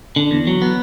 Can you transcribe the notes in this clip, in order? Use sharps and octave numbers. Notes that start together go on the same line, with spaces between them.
D3
E2
F#3
B3